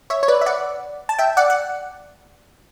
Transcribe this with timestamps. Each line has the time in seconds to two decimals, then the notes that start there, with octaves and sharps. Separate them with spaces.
0.10 C#5 E5
0.23 C#5
0.28 B4 D5
0.41 E5
0.46 D5 F#5
1.09 A5
1.19 E5 G5
1.37 D5 F#5
1.50 F#5